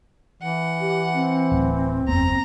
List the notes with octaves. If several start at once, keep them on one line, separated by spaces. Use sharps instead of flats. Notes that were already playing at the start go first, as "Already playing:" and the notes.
E3 F#5
G4
C4
D1
F#1 E2 B3 A#5